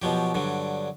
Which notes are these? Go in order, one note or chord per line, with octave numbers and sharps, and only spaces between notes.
B2 F3 F#3 G4
G2 D3 F#3